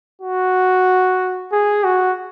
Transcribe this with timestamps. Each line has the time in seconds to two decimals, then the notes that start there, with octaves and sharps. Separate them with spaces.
0.22 F#4
1.52 G#4
1.84 F#4